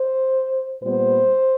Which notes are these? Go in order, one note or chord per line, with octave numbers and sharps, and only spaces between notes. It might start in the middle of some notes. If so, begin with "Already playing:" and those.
Already playing: C5
A#2 G3 B3 C5